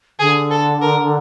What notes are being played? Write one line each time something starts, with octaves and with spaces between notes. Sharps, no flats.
D3 G#4
A4
A#4